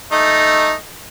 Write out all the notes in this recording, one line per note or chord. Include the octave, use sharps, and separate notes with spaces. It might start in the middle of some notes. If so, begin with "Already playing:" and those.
A3 D#4